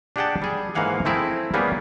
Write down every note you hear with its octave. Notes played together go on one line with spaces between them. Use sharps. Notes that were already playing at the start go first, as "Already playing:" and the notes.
D4 G4 G#4 F#5 G5 A5
G3 G#4
G#2 E3 A#3 F5 F#5 G#5
A3 C4 E4 G#4 A#4
G3 A#3 B3 C#4 G4 G#4